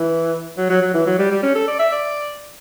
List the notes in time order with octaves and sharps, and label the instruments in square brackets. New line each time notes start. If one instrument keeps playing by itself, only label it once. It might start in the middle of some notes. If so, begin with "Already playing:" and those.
Already playing: [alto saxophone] E3
F#3
F#3
F#3
E3
F#3
G3
G3
C#4
A4
D5
E5
D5